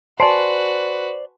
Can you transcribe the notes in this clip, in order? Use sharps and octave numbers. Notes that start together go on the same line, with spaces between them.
F#4 B4 C5 D5 G#5 A5 C6